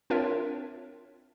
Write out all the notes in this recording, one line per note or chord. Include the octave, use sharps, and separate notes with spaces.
C4 D4 F4 A#4 C#5 E5